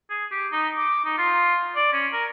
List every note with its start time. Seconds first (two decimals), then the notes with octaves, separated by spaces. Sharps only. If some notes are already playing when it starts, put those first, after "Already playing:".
0.10 G#4
0.31 G4
0.52 D#4
0.76 D6
1.05 D#4
1.18 F4
1.76 D5
1.93 C#4
2.13 A#4